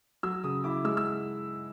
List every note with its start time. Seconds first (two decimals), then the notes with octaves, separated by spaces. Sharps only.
0.23 F#3 E6
0.44 C#3 D#6
0.64 E4 D6
0.84 G#3 E6
0.97 E6